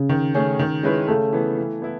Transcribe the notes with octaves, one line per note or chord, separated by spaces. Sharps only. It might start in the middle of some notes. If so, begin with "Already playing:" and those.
Already playing: C#3
D#3
A3 C#4 G#4
D#3
G#3 C#4 E4 B4
C#3 A3
E3 B3
E3
B3 E4